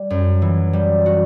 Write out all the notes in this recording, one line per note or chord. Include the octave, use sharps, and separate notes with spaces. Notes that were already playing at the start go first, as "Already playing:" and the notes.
Already playing: G3
F#2
E3
G3
F#4